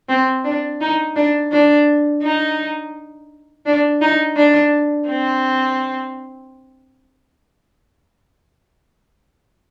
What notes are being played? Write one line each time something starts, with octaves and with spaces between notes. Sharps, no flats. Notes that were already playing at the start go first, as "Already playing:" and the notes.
C4
D4
D#4
D4
D4
D#4
D4
D#4
D4
C4